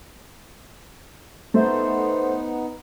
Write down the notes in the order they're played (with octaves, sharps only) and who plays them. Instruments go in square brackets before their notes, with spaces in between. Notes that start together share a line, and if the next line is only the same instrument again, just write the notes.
[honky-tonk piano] A3 E5 [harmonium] B3 D#4 [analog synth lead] C5